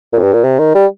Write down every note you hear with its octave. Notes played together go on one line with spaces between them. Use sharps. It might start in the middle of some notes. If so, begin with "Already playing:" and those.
A#2
F2
G2
A#2
C3
D#3
G3